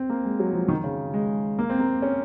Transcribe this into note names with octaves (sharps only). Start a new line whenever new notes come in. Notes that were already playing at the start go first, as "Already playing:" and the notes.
Already playing: C4
A#3
G#3
F#3
F3
D#3
C#3
G#3
A#3
C4
A#3
C#4